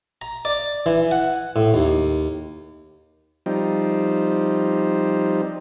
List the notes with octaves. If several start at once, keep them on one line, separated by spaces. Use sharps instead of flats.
A#5
D5
E3
F#5
A2
D#2
F3 G3 C4 D#4